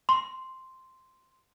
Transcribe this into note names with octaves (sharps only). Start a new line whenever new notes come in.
C6